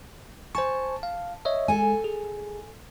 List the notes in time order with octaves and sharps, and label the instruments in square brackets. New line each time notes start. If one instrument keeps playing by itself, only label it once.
[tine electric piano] C5 G#5 C#6 [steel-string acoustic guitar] A5
[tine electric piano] F5
C#5 D#5 E5
[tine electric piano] G#3 [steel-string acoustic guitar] A4 G#5
[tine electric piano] G#4